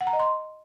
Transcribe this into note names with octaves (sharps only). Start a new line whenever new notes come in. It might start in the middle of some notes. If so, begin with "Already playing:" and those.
F#5
A#5
D#5
C6